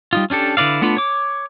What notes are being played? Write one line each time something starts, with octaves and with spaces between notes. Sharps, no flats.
G3 D#4 F4
C#4 D4 G4 A4
D3 E4 B4 D5 F5
A3 B3 D4 F4 B5
C#5 D6